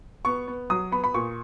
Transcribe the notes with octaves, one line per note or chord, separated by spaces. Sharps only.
B3 C#6
B3
F#3 D#6
B3 B5
B5
A#2 C#6